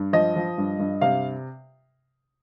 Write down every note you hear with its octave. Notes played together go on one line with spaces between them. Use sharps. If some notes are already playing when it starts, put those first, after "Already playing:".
Already playing: G2
F3 D#5
F3
G2
G2
C3 F5